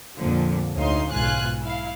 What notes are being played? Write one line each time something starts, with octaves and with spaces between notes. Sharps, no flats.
F2 A#2 D3 F3
D2 D#4 C#5 F5 C6
B1 G#2 F4 G#5 F#6
E4 F5